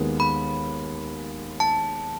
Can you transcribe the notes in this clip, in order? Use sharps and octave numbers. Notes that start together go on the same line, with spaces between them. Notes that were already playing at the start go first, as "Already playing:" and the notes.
Already playing: D#2 D#3 G#3 B3
B5
A5